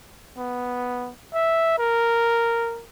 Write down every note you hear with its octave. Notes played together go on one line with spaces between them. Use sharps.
B3
E5
A#4